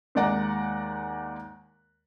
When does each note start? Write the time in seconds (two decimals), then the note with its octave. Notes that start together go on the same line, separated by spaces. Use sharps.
0.15 D#2 G#3 D5 F#5 A#5